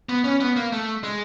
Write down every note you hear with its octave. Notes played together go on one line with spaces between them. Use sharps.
B3
C#4
B3
A#3
A3
G#3